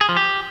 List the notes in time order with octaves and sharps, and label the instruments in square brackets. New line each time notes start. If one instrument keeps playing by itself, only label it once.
[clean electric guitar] G#4
F3
G4